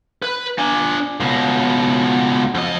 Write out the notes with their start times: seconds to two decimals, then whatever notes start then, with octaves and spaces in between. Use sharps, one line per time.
0.22 B4
0.58 D4 G#5
1.20 C#2 B2
2.55 F2 D#5